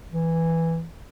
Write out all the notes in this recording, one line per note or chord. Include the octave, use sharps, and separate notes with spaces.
E3